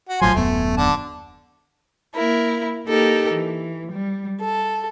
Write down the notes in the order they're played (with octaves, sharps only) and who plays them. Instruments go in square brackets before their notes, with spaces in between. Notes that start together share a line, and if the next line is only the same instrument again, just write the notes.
[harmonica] F#4
[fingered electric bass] A#1 A2 F#3 [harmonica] F3 G#5 C6
[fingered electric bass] D#1 F#2 B3 [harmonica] A3
[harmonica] D3 A5
[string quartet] A#3 E4 A#4
A#3 D#4 G4 A4 A#4
E3
G3
A4